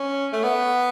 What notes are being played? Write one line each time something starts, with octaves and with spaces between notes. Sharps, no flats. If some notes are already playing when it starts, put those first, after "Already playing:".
Already playing: C#4
A3
B3